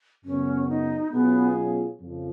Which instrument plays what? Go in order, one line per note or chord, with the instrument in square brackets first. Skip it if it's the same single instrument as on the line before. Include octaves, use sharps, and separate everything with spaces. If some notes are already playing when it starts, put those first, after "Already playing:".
[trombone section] F#2 C#3 F#3 B3 [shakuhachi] C#4
[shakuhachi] D#4
[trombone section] B2 F#3 C#4 F4 G#4 [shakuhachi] B3
[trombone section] F2 C#3 F3